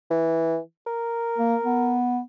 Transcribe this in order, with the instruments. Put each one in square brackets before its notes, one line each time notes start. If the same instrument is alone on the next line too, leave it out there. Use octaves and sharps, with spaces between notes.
[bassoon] E3
A#4
[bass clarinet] A#3
B3